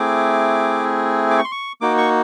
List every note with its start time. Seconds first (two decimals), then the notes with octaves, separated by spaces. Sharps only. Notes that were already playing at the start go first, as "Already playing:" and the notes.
Already playing: A3 C4 E4 G#4 D6
1.31 D6
1.38 C#6
1.44 C6
1.52 C#6
1.81 A#3 D#4 F#4 D6
1.98 C#6